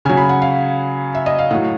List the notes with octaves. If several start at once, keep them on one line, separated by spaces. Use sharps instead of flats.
C#3 F#3 G#5
B5
F#5
F5
E5
D#5
F5
A2 F#3 F#5